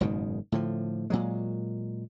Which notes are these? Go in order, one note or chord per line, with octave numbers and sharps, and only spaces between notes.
F#1 G#2 B2 D#3
A2 D3 F3
A#2 F#3 G#3